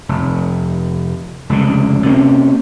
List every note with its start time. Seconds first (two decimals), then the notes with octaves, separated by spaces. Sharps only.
0.09 F1
1.49 F1 C#2 D3
2.06 C3 A#3 C4 C#4